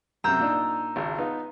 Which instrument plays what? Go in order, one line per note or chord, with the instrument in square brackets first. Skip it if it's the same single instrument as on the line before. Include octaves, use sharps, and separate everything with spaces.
[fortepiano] F#2 C3 [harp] A#5 E6 G6
[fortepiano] A#2 D4 D#4
G#1 C#2
B3 D#4 F4